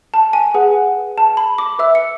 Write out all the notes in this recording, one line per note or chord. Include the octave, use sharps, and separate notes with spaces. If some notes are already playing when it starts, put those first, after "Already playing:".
A5
G#5
G#4 B4 F#5
A5
B5
D6
B4 E5 E6
C#7